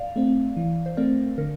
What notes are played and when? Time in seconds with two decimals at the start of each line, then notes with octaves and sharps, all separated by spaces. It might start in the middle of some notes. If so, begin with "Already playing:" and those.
Already playing: D5 F5
0.16 A3 C4
0.57 E3
0.86 C5
0.97 A3 C4 A#4 D5
1.38 D3 A#4